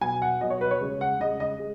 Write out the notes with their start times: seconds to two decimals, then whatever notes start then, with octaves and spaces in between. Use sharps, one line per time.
0.01 B2 F#3 G#5
0.22 F#5
0.40 B2 F#3 D#5
0.50 C#5
0.61 B4
0.71 C#5
0.81 C#3 G#3
1.01 F#5
1.20 C#3 G#3 D#5
1.40 D#5
1.59 G#3